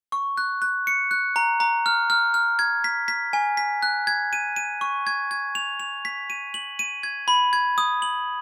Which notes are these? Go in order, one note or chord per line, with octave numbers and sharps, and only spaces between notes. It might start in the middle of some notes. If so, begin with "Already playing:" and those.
C#6
F#6
F#6
C#7
F#6
A#5
A#5
F6
F6
F6
G#6
B6
B6
G#5
B6
F#6
G#6
D#7
D#7
C#6
G#6
G#6
F7
F7
B6
D#7
F#7
D#7
G#6
B5
G#6
D#6
F#7